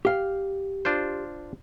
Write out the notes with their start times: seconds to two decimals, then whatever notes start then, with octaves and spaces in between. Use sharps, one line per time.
0.05 G4 F5
0.85 D4 F4 C5